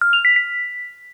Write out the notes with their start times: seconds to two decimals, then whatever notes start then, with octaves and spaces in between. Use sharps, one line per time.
0.01 F6
0.13 F7
0.25 B6
0.36 B6